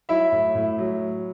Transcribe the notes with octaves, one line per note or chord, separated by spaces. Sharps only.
F#3 E4 E5
A2
A2
F#3